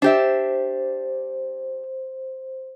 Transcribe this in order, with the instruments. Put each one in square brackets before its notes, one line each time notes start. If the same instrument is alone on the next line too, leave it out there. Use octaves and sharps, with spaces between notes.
[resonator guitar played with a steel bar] D4 G4 E5 [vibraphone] C5